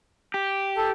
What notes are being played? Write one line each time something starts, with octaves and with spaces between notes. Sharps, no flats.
G4
A4